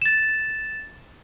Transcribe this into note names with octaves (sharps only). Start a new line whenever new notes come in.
A6 E7